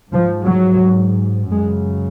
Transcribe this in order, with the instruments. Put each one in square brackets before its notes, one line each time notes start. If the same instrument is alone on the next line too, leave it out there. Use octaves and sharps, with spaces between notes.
[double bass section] G#2 F3
F#3
F#2 C#3 G#3